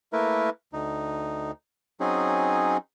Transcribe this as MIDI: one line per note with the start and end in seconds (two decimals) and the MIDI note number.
0.13 0.50 57
0.13 0.50 58
0.13 0.50 64
0.13 0.50 70
0.13 0.50 71
0.73 1.51 38
0.73 1.51 63
2.00 2.77 54
2.00 2.77 60
2.00 2.77 61
2.00 2.77 63
2.00 2.77 68